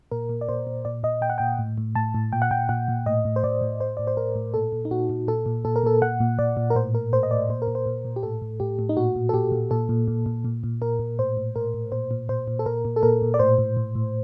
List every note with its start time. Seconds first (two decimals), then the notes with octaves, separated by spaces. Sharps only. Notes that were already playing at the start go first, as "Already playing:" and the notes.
0.12 A#2 A#4
0.29 A#2
0.41 D5
0.49 A#2 C5
0.67 A#2
0.85 A#2 D5
1.03 A#2 D#5
1.21 A#2 G5
1.30 F#5
1.38 A#2 G5
1.59 A2
1.78 A2
1.95 A2 A5
2.15 A2
2.33 A#2 G5
2.42 F#5
2.51 A#2 G5
2.69 A#2 F#5
2.88 A#2
3.06 A2 D#5
3.25 A2
3.36 C5
3.44 A2 D5
3.62 A2
3.80 A2 C5
3.97 A2 D5
4.07 C5
4.17 A2 A#4
4.36 A2
4.54 A#2 A4
4.72 A#2
4.85 D#4
4.91 A#2 F#4
5.09 A#2
5.28 A#2 A4
5.46 A#2
5.65 A#2 A4
5.76 A#4
5.83 A#2 A4
6.02 A#2 F#5
6.20 A#2
6.39 A#2 D5
6.57 A#2
6.70 A#4
6.75 A2 C5
6.94 A2 A#4
7.13 A2 C5
7.23 D#5
7.31 A2 D5
7.49 A#2 C5
7.62 A#4
7.68 A#2
7.75 C5
7.86 A#2
8.05 A#2
8.16 G4
8.23 A2 A4
8.42 A2
8.60 A2 G4
8.79 A2
8.89 D#4
8.97 A#2 F#4
9.16 A#2
9.29 A4
9.34 A#2 G4
9.52 A#2
9.71 A#2 A4
9.89 A#2
10.08 A#2
10.26 A#2
10.45 A#2
10.63 A#2
10.82 A#2 A#4
10.99 A#2
11.19 A2 C5
11.37 A2
11.56 A2 A#4
11.74 A2
11.92 A#2 C5
12.11 A#2
12.29 A#2 C5
12.48 A#2
12.59 A4
12.66 A#2 A#4
12.85 A#2
12.96 A4
13.03 A#2 A#4
13.22 A#2
13.34 D5
13.39 A2 C5
13.58 A2
13.77 A2
13.95 A2